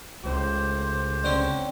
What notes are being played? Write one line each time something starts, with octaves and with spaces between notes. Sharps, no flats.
C#2 A2 G4 C5
D3 C4 C#4